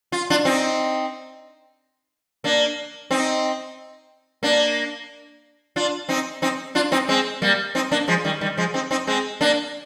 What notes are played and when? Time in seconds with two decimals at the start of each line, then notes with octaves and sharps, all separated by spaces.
0.12 F4
0.30 D4 F4
0.45 C4 D#4
2.44 A#3 D4
3.11 C4 D#4
4.43 A#3 D4
5.76 D4 F4
6.09 C4 D#4
6.42 C4 D#4
6.75 D4 F4
6.92 C4 D#4
7.08 G#3 C4
7.42 G3 A#3
7.75 C4 D#4
7.91 A#3 D4
8.08 F3 G#3
8.24 D#3 G3
8.41 D#3 G3
8.57 F3 G#3
8.74 C4 D#4
8.91 C4 D#4
9.07 G#3 C4
9.41 A#3 D4